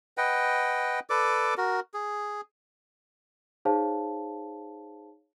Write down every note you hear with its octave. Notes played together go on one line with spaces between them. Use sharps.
B4 D#5 F#5 G5
A4 B4 D5 D6
F#4 A#4
G#4
D#4 G#4 C5 C#5 F5 A5